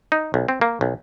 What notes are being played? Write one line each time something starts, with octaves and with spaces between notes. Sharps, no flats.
D#4
B1
C4
A#3
B1